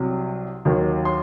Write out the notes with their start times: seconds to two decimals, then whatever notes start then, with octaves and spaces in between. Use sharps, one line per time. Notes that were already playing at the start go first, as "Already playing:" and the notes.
Already playing: C2 C3 F#3
0.65 D#2 D#3 F#3
1.05 C6